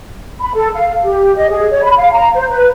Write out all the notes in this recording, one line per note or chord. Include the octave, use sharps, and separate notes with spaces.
B5
A4
F5
G4
D#5
G#4
C#5
B5
F5
A#5
C5
B4